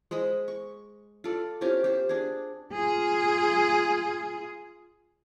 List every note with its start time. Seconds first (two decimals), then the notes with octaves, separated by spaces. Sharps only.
0.11 G#3 C5 D#5 B5
0.48 C#6
1.24 F4 A4 D5
1.61 C4 C#4 F4 G4
1.84 G4 C5
2.09 D4 G#4
2.73 F4 G#4